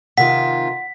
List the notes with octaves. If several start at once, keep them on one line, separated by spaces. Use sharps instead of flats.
C3 D#3 F4 F#5 B6